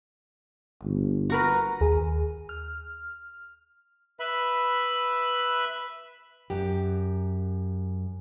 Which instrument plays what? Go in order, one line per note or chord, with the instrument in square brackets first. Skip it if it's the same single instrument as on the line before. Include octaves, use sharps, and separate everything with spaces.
[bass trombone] G1
[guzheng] F#4 A#4 B4
[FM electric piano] D#2 G#4
F6
[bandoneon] B4 E5 B5
[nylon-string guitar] F#2 G4